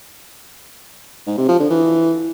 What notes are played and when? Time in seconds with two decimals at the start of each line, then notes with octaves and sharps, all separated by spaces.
1.27 G#2
1.38 C3
1.48 F3
1.59 D3
1.70 E3